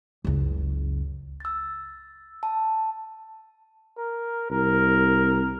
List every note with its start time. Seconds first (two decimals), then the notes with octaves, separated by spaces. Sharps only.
0.25 F#1 C#2
1.40 E6 A6
2.43 A5
3.98 A#4
4.50 C2 A#4